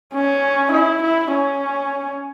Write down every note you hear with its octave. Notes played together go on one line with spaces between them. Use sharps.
C#4
E4
E4
C#4